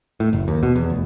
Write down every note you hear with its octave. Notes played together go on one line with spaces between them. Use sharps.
A2
F#1
D#2
B2
E2
F1